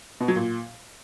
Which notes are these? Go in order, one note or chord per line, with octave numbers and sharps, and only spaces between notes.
B2
F#3
A#2